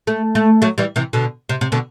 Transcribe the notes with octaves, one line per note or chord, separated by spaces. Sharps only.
A3
A3
F#3 A3
E3 G3
C3 E3
B2 D3
C3
C3
B2 D3